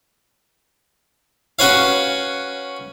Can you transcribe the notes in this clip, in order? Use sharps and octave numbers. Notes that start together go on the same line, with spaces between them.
C#4 F#4 B4 C#5 F5